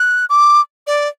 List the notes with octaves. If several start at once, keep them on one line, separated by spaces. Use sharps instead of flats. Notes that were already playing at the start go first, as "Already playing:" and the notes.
Already playing: F#6
D6
D5